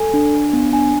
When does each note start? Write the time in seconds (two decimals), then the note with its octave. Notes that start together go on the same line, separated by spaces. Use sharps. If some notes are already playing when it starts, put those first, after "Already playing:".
Already playing: A4 G#5
0.14 D4
0.33 D4
0.53 B3
0.73 D4 G#5